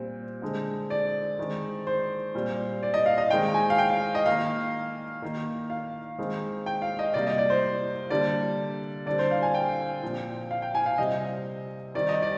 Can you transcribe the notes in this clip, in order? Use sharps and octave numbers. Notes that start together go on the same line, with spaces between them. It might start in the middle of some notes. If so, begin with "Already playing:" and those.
Already playing: A#2 G3 C4
D3 G#3 C4
D5
D#3 G#3 C4
C5
A#2 G3 C4
D5
D#5
F5
D#5
D#3 G#3 C4 G5
G#5
F5
G5
F5
D#5
D#3 A#3 F5
D#3 A#3
F5
D#3 G#3 C4
G5
F5
D#5
C3 G3 A#3 D5
D#5
D5
C5
D3 G3 A#3 D5
D3 G3 C4 D5
C5
F5
G#5
G5
A#2 F3 C4
F5
G5
G#5
F5
C3 G3 C4 D#5
D#3 G3 C4 D5
D#5
D5